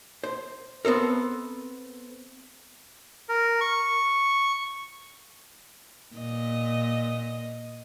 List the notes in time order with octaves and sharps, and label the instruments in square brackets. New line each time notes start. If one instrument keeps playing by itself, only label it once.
[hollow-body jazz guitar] C5
B3 C4 A4 A#4
[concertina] A#4
C#6
[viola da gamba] A#2 D#5